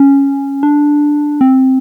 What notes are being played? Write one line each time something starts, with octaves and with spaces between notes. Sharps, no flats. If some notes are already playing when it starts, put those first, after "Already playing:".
Already playing: C#4
D4
C4